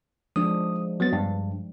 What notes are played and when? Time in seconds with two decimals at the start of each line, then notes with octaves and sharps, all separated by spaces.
0.36 F3 G#3 D4 D#6
1.00 F#3 B3 A6
1.13 G2